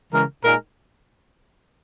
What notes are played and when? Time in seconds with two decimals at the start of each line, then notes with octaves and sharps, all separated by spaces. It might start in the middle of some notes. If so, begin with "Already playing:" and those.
0.12 C#3 E3 G#3 A#4
0.43 A#2 G#3 D#4 A#4